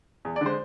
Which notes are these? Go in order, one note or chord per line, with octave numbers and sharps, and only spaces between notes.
E2
D5
D3 G#3 C5